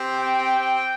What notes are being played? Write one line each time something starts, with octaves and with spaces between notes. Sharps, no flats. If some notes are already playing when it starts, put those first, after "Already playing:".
Already playing: C4 G4
G5